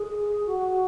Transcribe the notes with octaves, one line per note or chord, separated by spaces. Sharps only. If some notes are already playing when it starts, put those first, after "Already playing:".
Already playing: G#4
F#4